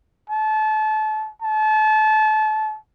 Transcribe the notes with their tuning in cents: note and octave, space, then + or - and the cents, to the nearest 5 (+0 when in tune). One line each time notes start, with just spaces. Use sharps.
A5 -30
A5 -30